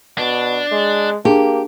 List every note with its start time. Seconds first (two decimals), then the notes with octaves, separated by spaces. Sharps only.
0.18 B2 D4
0.72 G#3
1.25 A#3 D4 G4 G#4 A5